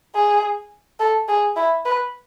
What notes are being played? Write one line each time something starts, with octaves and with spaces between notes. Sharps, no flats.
G#4
A4
G#4
E4
B4